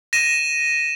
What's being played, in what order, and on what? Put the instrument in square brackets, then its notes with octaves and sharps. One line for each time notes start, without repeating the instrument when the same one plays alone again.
[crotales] A#6 D#7 E7